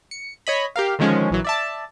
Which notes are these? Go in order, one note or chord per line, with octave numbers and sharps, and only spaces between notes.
C#7
C#5 D#5 B5
G4 A#4 F5
D3 D#3 F3 G#3 C#4
A#1 E3 F#3
D5 E5 A5